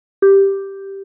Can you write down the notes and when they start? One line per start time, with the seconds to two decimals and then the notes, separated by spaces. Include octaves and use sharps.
0.22 G4